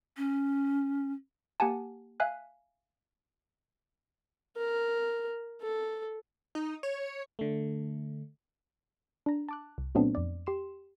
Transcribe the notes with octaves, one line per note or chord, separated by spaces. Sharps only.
C#4
A#3 G4 F#5 G#5 A5
E5 F5 G#5 F#6
A#4
A4
D#4
C#5
D3 A3
D4 A#5
A5 D6 F#6
C2
A#2 F#3 A3 B3 C4 D4
F2 D5
G4 C6 E7